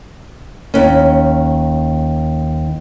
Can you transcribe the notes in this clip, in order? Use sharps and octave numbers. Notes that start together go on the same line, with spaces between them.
D#2 C#4